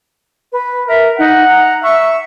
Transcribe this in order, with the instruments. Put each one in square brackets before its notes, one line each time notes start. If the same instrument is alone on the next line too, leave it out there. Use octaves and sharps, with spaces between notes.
[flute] B4
[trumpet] A#4 [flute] E5
[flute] D#4 [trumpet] F#5
[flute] A#5
[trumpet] E5 [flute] C#6